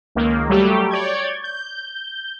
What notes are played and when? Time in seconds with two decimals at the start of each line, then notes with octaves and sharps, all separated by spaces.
0.15 C#2 D#3 A#3
0.49 F#3 G3 A3 G4
0.91 C#5 D5 G6 G#6
1.44 G6